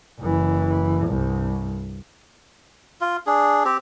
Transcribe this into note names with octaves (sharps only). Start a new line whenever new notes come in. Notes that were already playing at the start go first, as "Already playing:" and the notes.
F#1 E3
C2 G2
F4
D4 G#4
C4 G4